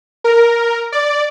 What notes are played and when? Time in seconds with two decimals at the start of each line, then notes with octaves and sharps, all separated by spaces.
0.24 A#4
0.92 D5